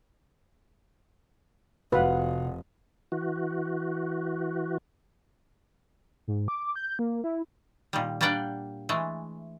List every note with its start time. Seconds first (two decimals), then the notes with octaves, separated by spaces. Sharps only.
1.92 F1 C3 F#4 B4 F5 F#5
3.12 E3 F#4
6.28 G#2
6.48 D6
6.76 G6
6.99 A#3
7.24 E4
7.93 A#2 D#3 G3
8.21 G3 A#3 D4 D5 F#5 G5
8.89 E3 G#3 A3